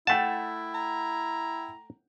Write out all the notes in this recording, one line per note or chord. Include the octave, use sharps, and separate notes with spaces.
A3 E4 F#5 G5 A5
A#5